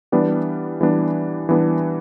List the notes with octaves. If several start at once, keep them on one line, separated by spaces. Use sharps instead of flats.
E3 G3 B3 D4 B4
E3 G3 B3 D4 B4
E3 G3 B3 D4 B4